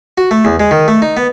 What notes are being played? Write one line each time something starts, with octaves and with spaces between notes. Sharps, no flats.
F#4
A3
E2
G#3
D#3
A3
D#4
B3